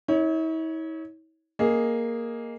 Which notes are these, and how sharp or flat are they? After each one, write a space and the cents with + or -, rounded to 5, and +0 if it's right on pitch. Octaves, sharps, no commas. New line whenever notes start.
E4 -45 C#5 +5
A#3 +0 G#4 +0 D#5 +0